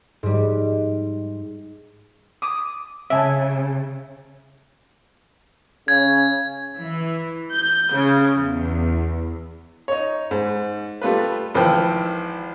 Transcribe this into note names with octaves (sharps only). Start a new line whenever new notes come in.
G#2 G3
D6 D#6
C#3 E5 G#5 A5
C#3 G#6
E3
G6
C#3
E2
D#4 C#5
G#2
G3 A3 F4 B4
G#1 E3 F3 G5